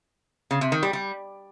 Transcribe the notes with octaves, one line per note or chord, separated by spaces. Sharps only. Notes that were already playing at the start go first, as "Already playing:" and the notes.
C#3
C3
D#3
G3
G3